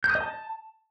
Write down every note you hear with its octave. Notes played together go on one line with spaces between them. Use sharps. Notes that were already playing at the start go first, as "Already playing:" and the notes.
G6
D#6
D#5
A5